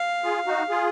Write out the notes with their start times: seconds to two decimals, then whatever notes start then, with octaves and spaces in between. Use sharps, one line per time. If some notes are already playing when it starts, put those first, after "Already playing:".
Already playing: F5
0.23 F4 G#4
0.47 D#4 F#4
0.70 F4 G#4